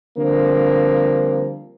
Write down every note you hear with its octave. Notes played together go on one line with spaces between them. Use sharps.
D3 F3 G3 A#3 C4